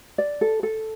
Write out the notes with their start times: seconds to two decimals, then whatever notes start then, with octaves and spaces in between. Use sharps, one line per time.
0.18 D5
0.41 A4
0.63 A4